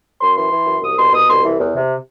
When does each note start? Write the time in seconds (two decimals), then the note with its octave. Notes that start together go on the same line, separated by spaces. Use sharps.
0.20 F#2 C6
0.36 E3 C6
0.52 E3
0.67 F#2
0.82 C2 D#6
0.97 B2 C6
1.13 B2 D#6
1.28 C2 C6
1.43 E3
1.59 E2
1.74 C3